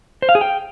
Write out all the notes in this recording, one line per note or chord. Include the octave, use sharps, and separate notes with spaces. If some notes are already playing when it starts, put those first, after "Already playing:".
C5
F5
G#4
G5